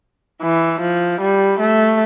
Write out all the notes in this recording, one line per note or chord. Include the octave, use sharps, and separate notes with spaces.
E3
F3
G3
A3